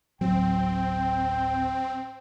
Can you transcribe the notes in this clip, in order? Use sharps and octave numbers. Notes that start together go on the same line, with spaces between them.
G1 D2 A2 F#3 C4 G5